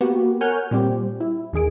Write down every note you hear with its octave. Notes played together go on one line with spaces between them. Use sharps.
A#3 B3 F#4 G4
A#4 C#5 F#5 G#5 F6 G6
A#2 G3 C4 G4
E4
D#2 D#3 G#4 D7